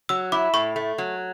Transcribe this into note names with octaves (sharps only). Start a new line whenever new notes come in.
F#3 E6
E4 D6
A2 C#6
A3
F#3